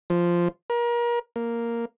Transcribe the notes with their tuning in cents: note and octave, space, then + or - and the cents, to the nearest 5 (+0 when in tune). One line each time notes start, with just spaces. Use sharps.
F3 -5
A#4 +35
A#3 +0